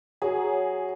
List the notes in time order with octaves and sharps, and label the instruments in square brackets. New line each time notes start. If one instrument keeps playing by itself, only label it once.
[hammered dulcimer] F#3 [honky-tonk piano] G#4